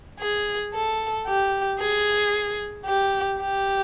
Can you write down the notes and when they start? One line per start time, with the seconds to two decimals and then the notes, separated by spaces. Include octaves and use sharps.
0.20 G#4
0.74 A4
1.27 G4
1.80 G#4
2.86 G4
3.40 G4